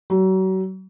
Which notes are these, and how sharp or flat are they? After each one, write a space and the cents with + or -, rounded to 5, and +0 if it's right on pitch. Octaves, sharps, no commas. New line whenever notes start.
F#3 +35